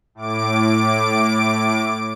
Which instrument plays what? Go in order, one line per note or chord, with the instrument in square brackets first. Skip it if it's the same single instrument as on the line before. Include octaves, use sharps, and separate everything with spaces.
[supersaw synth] A2 D6 D7